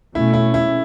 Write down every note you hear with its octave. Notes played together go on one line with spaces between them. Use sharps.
B2 A3 C#4 E4
E4
E4